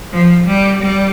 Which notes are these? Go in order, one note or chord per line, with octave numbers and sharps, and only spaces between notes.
F3
G3
G3